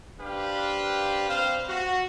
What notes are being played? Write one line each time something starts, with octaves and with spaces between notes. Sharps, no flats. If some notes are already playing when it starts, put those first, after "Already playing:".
D4 G4 B4 C5 F5
C4 C5 F5
F#4